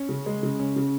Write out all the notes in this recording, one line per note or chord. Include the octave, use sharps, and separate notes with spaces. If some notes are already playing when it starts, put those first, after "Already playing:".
Already playing: C#4
C#3
G#3
C#3
C#4
C#3